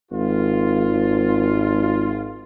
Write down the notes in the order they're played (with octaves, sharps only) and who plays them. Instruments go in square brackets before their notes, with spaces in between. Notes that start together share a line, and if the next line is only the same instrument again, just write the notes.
[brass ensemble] G#1 F4